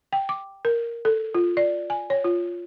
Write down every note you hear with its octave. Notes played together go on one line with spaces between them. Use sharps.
G5
D6
A#4
A4
F4
D5
G#5
C#5
F4